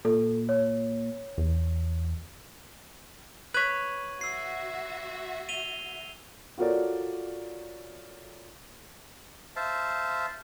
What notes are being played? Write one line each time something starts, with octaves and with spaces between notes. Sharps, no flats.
A#2 A4
C#5
E2
B4 C#5 F#6 G#6 B6 D#7 F#7
F#4 E5 E6 C7
D#7 F7 G7
F4 F#4 A4 A#4 C#5 D5
C5 E5 F5 A5